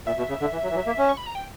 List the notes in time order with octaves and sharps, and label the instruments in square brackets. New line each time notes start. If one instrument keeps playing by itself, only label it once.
[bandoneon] A#2 [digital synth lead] E5
[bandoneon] B2
C#3
D3
E3
F#3
E3
F#3
A#3
C#4
[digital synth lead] C#6
B5
A#5
G5